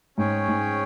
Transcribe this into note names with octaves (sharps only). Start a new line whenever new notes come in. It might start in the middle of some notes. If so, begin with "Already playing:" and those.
G#2 C#4 G#4 C#5 G5
G#2